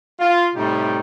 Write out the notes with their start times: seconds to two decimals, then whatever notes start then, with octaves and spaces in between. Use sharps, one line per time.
0.19 F4
0.55 A2 C3 G3 D#4 G4